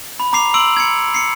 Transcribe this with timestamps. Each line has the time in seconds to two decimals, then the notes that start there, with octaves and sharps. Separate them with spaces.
0.20 B5
0.33 A#5 D6 C7 F7
0.54 C6 E6 D7 F#7
0.77 G#6 C#7
1.14 C7 C#7